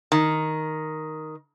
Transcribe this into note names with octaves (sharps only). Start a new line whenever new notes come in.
D#3